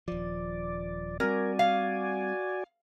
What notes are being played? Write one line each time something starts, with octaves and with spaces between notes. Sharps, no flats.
D#1 F3 D5
G3 C4 F#4 A#4 D5 G#5
F5